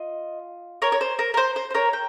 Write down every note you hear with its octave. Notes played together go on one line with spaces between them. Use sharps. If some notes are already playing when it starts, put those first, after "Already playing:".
Already playing: F4 D#5
A#4 C#5
C#5
C5
A#4
A#4
C5
C5
C5
A#4 C#5
G5